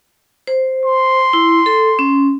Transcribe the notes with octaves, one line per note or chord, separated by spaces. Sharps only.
C5
C6
E4
A4
C#4